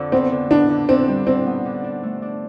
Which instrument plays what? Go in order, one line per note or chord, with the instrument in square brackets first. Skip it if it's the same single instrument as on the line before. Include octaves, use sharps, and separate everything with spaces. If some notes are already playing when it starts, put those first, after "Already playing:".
Already playing: [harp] F2 D3
[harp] B3 [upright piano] C4
[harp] D3
[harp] B3 [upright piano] D4
[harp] D3
[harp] D3 [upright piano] C4
[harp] G3
[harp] D3 [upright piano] C4
[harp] B3
D3
D4
A3
D4